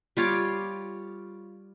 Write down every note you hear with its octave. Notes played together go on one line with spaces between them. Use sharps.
G3 F4 C#5 D6